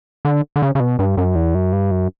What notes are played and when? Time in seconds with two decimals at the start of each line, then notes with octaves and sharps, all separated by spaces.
0.25 D3
0.56 D3
0.62 C#3
0.75 C#3
0.80 B2
0.99 G2
1.17 F#2
1.35 E2
1.55 F#2
1.73 G2
1.91 F#2